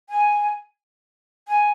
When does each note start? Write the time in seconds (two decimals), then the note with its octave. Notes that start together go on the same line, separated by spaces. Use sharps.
0.09 G#5
1.48 G#5